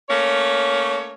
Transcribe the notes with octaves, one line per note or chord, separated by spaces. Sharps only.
A3 A#3 C#4 C#5